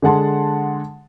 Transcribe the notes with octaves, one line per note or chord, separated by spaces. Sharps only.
D3 G#3 F#5 A5 C6